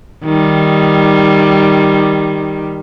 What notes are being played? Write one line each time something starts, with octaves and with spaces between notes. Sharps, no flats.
D#3 G3